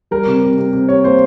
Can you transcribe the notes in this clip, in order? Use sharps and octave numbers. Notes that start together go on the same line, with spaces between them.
G3 A#4
C3
C3
C3
C3
C3 C#5
A#3 C5